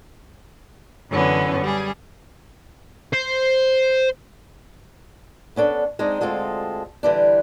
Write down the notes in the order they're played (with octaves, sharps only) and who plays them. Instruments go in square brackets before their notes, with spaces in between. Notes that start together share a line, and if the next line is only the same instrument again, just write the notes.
[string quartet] F#2 D3 E3 B3 C#4
G3 G#4
[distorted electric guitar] C5
[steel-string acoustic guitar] B3 C#4 D4 A4
G#3 C4 D4 D#4
D2 G#3 C4 F4 A4
D3 E3 G3 D4